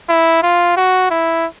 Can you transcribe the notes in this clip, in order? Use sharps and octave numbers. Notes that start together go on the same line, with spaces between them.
E4
F4
F#4
E4